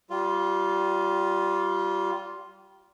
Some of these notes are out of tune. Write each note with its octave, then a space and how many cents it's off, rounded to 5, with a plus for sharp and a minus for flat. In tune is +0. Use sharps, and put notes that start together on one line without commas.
G3 -25 F4 +0